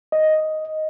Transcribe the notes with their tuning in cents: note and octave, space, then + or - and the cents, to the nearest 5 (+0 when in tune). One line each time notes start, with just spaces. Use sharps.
D#5 +5